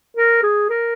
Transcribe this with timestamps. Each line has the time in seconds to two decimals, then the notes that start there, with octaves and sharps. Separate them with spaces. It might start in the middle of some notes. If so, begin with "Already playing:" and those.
0.17 A#4
0.43 G#4
0.70 A#4